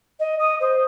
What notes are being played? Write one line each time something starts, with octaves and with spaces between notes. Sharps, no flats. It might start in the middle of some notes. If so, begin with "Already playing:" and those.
D#5
D#6
C5